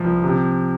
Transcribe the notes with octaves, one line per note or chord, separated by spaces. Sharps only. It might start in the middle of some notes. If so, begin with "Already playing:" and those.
Already playing: C2 F3
C3